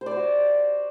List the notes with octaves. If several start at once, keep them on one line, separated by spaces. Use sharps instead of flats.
C5
D5
C5
F#4